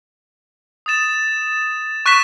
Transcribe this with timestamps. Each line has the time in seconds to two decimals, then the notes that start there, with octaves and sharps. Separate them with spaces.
0.86 D#6 A6 E7
2.06 C#6 F#6 B6 E7